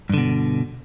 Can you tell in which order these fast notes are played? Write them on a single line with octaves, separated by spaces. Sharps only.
G2 D3 B2